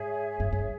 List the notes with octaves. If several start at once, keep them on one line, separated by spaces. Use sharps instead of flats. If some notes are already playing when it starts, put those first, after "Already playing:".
Already playing: G#2 G#4 C#5 E5
G2
G2